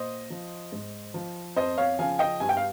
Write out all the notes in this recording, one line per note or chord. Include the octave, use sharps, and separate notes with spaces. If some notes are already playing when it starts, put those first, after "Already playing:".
Already playing: A#2 C5 D#5
F3
G#2
F3
F2 C5 D#5
C#5 F5
C#3 F3 F5 G#5
D#5 G5
G2 G#5
G5
F5